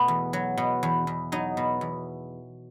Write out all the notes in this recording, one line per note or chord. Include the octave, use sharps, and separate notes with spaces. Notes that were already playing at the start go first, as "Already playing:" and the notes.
Already playing: B2 A3 B3
E2
F#3
B2
E2
E2
F#3 D#4
B2
E2